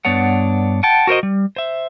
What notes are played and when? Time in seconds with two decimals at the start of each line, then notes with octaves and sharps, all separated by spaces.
0.05 G2 B3 D4 C#5 F#5
0.83 F#5 G5 A5
1.07 F#4 A#4 C5 D#5
1.23 G3
1.56 C5 E5